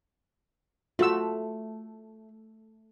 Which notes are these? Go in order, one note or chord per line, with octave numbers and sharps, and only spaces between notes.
A3 F4 F#4 E6